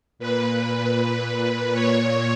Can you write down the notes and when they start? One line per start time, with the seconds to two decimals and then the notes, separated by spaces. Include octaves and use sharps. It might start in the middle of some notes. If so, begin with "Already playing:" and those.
0.19 A#2 B4
1.74 A#2 C#5